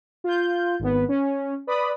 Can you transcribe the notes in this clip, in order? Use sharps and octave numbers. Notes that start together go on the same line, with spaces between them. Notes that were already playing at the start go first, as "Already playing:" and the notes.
F4 G6
G#1 B3
C#4
B4 D5 B5 D#6